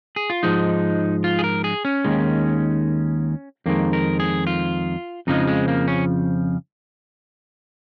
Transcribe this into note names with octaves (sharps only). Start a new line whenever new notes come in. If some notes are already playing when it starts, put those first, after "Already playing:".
G#4
F4
G#2 F3 G#3 D#4
F4
G#4
A#4
G#4
C#4
D#2 D#3 G#3
F2 D#3 G#3 A#3
A#4
G#4
F4
F2 C#3 F3 G#3 D#4
G#3
A#3
C#4